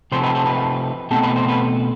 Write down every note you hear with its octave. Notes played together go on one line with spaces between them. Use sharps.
C3 F3 A3 C4 C5
B4
A4
B4
B2 A3 C4 A4
B4
C5
B4